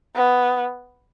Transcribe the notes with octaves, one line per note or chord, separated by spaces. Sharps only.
B3